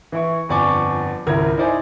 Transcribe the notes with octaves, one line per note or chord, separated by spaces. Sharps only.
E3 E4 C#6
G1 F2 D5 G#5 C#6 D6
G#1 C#2 E4 A#4 G#6
D#4 E4 C5 D5 D#5 G#5